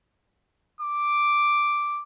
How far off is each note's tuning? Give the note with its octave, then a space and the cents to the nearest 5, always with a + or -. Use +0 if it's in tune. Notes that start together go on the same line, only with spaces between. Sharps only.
D6 +0